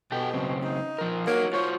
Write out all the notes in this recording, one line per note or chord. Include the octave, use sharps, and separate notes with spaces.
B2 G4 A4 G5
F#2 C#3 C4
D#4
F3 A#4
A#3 D#4 F#4 C#5
F4 F#4 C5 C#5